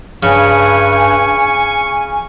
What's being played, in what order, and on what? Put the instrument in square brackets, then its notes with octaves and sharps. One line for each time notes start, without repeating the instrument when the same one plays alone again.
[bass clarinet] G2 [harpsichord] C#3 [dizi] G#5 [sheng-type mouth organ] C#6